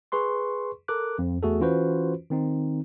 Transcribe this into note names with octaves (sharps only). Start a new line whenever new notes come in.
G#4 B4 C6 C#6
A4 A#4 D6 F#6
F2
E2 A3 F#4 G#4 A4
E3 C#4 F4 F#4 B4 C5
D#3 C4 D#4